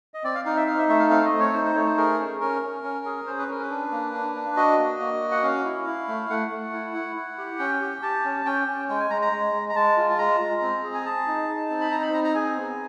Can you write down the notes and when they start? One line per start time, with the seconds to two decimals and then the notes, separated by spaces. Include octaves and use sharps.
0.14 D#5
0.24 C4 D5
0.35 F5
0.45 D#4 F5
0.56 E5
0.67 D#4 F5
0.78 E5
0.88 A3 E5
0.99 F5
1.10 C4 F5
1.25 D#5
1.32 A3
1.39 C#5
1.53 D#4 C5
1.65 C5
1.75 A3 C#5
1.86 C5
1.97 G#4 A#4
2.19 C#4
2.40 C#4 A#4
2.62 C#4
2.83 C#4
3.05 G#4
3.27 C#4 C5
3.39 B4
3.48 C#4 A#4
3.62 B4
3.70 D4
3.91 A#3
4.13 D4
4.35 D4
4.56 F#4 D#5
4.78 A#3
5.00 A#3
5.21 F#4
5.31 F#5
5.43 C#4 F5
5.64 E4
5.86 E4
6.08 A3
6.30 A3 F#5
6.51 A3
6.73 E4
6.94 E4
7.16 E4
7.38 G4
7.59 C#4 G5
7.81 G4
8.02 G4 A5
8.25 C#4
8.46 C#4 G5
8.68 C#4
8.89 G#3 G5
9.00 G#5
9.10 G#3 A#5
9.22 A#5
9.32 G#3
9.54 G#3
9.69 A#5
9.75 G#3 A5
9.97 F4
10.10 A5
10.18 G#3 A#5
10.40 G#3
10.62 C4
10.84 G#4
10.94 G#5
11.05 G#4 A5
11.27 D#4
11.48 D#4
11.70 C4
11.81 B5
11.91 D#4 A#5
12.02 B5
12.13 C4 A#5
12.24 A#5
12.34 G#4 G#5
12.57 B3